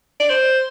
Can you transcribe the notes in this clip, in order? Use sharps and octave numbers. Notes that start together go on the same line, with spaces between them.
D5
C5